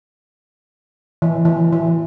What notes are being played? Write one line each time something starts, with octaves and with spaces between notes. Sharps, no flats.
E3
E3
E3